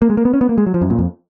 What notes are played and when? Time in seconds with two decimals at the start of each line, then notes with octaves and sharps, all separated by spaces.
0.02 A#3
0.10 G#3
0.17 A#3
0.25 B3
0.34 C#4
0.41 B3
0.49 A#3
0.58 G#3
0.67 F#3
0.74 F3
0.82 F#2
0.90 A#2
0.99 F2